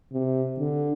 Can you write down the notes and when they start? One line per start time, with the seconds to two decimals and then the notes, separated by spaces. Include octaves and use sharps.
0.12 C3
0.58 D3